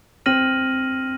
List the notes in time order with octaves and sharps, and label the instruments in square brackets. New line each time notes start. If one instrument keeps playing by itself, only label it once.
[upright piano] C4 [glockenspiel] F6 A#6 D#7 F#7